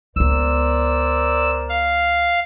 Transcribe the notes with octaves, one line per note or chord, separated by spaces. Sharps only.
C#2 B3 A#4 C5 D5 E6
F5